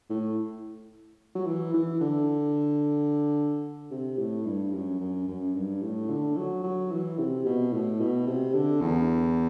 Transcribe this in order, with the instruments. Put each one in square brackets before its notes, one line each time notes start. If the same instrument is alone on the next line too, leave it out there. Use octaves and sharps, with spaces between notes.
[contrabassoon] A2
F#3
E3
E3
D3
C3
A2
G2
F#2
F#2
F#2
G2
A2
D3
F#3
F#3
E3
C3
B2
A2
B2
C3
D3
E2